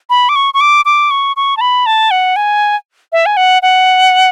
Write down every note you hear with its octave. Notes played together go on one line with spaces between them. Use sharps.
B5
D6
C#6
C#6
D6
D6
C#6
C#6
A5
B5
A5
F#5
G#5
E5
G#5
F#5
F#5